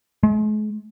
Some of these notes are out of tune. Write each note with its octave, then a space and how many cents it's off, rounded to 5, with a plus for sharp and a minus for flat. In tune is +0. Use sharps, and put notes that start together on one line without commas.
G#3 +45